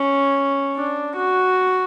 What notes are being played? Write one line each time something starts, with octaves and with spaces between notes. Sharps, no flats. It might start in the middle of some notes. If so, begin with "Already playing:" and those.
Already playing: C#4
D4
F#4